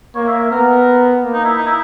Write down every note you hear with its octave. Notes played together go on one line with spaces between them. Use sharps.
A#3 C#5
E5
E5
B3 A#4
A#3
D#4
E4
D#4
E4